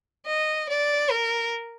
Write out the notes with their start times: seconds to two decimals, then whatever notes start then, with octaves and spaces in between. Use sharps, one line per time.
0.26 D#5
0.69 D5
1.11 A#4